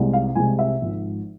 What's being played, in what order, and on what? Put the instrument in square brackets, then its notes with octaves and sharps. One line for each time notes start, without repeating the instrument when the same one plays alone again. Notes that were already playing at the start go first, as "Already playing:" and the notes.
Already playing: [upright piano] C2 C3 G#3
F5
C2 C3 G#3 G#5
E5
G#1 G#2 F3